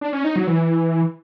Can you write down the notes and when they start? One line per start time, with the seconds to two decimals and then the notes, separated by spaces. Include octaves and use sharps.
0.01 D4
0.13 C#4
0.24 D#4
0.36 F#3
0.47 E3